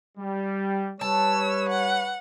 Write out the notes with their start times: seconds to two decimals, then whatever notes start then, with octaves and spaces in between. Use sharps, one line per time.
0.18 G3
1.01 G3 B4 C#5 A5 E6
1.69 F#5